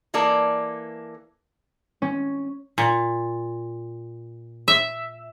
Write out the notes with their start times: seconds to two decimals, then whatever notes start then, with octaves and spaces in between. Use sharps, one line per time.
0.14 E3 A#3 A4 D5
2.02 C#4
2.78 A#2
4.68 E5